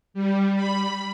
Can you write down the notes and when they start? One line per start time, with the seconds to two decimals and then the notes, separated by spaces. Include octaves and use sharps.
0.14 G3
0.56 B5